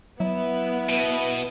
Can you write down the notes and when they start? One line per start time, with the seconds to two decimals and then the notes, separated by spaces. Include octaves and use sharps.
0.20 F#3 B3 E4
0.89 B2